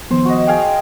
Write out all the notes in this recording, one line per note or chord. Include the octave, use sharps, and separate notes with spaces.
D#3 F3 B3 C5
F#4 D#5
G#4 F5 G5